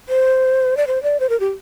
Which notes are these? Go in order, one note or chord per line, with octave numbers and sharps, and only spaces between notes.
C5
D5
C5
D5
C5
A#4
G4